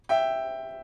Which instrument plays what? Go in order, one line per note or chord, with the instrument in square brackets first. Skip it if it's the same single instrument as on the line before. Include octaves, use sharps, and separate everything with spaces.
[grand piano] E5 G5